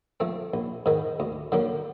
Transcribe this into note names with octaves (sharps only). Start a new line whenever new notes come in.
F3 A3 C4
A#1
G#2 D#3
D2
D3 F#3 A#3